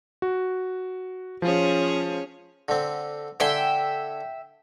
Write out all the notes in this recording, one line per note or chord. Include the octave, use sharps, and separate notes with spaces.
F#4
F3 C#4 F4 G#4 C#5
D3 C4
D3 E5 G5 G#5 C6